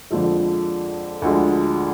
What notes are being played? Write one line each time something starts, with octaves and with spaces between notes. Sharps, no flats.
F2 D3 F3 G#3
D2 D3 F3 G#3